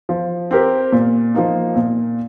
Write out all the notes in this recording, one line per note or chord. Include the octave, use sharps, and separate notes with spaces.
F3
C4 G4 A#4
A#2
F3 A#3 D#4
A#2